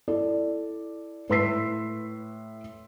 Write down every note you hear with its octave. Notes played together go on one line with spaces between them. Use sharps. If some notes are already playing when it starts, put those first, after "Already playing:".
E4 A4 D5
A2 B4 C6 E6 B6 C7